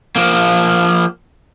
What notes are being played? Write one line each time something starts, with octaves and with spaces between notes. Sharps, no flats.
F3 A#3